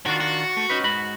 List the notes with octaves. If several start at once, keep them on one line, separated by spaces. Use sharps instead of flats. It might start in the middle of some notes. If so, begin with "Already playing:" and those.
D#3 D4 F4 F#4
F#4
A3
C#4 D#4 B4
G#2 F#4 B5